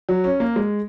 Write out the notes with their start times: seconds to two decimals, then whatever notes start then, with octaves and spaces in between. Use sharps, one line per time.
0.09 F#3
0.24 C#4
0.40 A#3
0.56 G#3